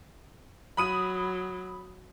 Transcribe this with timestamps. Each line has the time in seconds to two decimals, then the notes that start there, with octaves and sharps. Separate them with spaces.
0.77 F#3 B5 D#6 D#7